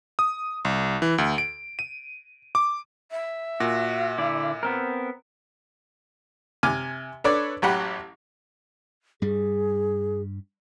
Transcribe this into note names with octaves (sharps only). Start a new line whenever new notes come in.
D#6
C2
E3
D2
D7
D#7
D6
E5
A#2 F#4
D3 E4 D5
B3 C4 A#4
C3 G#5 D6 F6
D4 A4 B4 C#5 D5
A1 F#3 G4 F#5 B5
G2 G3 G#4